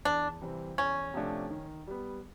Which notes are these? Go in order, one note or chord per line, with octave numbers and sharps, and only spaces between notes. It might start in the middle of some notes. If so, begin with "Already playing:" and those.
E2 D4
C3 E3 G3 C4
E2 C#4
C3 F3 A3 D4
D#3
G3 B3